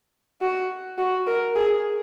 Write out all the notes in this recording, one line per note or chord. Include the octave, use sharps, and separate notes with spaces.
F#4
F#4
A#4
G#4